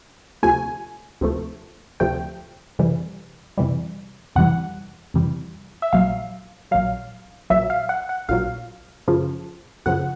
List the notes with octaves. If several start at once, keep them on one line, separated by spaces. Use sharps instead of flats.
D2 C3 F3 A3 G#5
D2 C3 F3 A3
D2 C3 F3 A3 G5
F2 C3 E3 G3
F2 C3 E3 G3
F2 C3 E3 G3 F#5
F2 C3 E3 G3
E5
A#1 A#2 F#3 F5
A#1 A#2 F#3 F5
A#1 A#2 F#3 E5
F5
F#5
F#5
A#1 A#2 F#3 F5
F#2 C#3 F3
F#2 C#3 F3 F#5